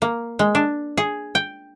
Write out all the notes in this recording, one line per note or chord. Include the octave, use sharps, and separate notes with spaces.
A#3
G#3
D4
G#4
G5